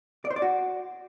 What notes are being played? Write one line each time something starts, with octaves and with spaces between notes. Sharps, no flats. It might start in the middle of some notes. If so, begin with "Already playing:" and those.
D5
C5
D5
F#4